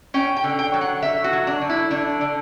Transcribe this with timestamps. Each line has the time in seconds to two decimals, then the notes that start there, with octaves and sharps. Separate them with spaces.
0.14 C#4 G5
0.37 G5
0.44 D3
0.59 G5
0.74 F#3
0.81 F#5
1.02 D3 E5
1.24 F#4
1.33 F#3
1.47 D4
1.61 D3
1.70 E4
1.91 D3 D4
2.21 D3